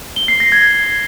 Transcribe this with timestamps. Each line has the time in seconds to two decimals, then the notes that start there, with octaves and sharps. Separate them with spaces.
0.16 G7
0.28 C7
0.40 A#6
0.52 G#6